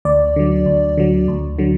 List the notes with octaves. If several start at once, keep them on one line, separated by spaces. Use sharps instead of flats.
D2 D5
D3 F#3
D2
D3 F#3
D2
D3 F#3